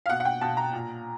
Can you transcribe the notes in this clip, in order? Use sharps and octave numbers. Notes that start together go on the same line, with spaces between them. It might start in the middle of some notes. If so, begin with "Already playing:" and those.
F5
B2 F#5
F#5
G5
B2 A5
A#5
A#2